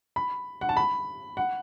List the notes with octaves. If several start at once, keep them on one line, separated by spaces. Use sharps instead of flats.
B5
F#5
A5
B5
F#5